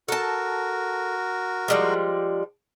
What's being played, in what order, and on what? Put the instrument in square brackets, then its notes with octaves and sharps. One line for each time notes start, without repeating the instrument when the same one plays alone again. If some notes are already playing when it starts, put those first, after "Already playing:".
[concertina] F#4 A#4 [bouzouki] A4 A5
[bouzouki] F3 G3 G#3